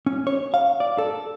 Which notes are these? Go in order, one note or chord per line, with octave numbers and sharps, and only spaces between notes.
C#4
C#5
F5
D5
A4